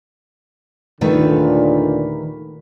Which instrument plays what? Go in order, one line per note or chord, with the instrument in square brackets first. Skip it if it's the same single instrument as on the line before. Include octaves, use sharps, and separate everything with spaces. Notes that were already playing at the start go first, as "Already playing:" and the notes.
[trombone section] D#2 A#2 D3 [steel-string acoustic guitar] D#3 A3 B4